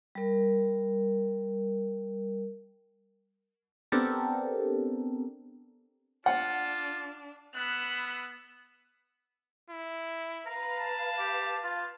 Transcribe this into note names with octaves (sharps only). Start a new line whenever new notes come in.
G3 A#4
B3 C4 D4 G4 A4 A#4
D4 F4 F#5
B3 B5 E6 F#6
E4
B4 F5 A#5
A5
G4
F4